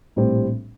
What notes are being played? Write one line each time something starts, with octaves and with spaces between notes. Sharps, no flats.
A#1 A2 G3 C4